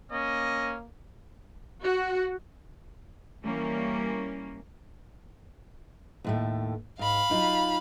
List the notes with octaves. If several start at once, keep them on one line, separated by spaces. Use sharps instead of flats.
A#3 C#4 D#5
F#4
E3 G3 A#3 C#4
D#2 A2 A3
G#2 F5 B5
F#3 D#4 F4